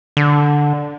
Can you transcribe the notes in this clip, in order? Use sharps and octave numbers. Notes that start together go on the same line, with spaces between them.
D3